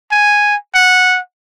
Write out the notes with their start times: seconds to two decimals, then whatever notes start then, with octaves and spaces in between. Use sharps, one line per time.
0.11 G#5
0.75 F#5